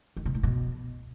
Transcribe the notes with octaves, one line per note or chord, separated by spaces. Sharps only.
D#3
C3
A2
B2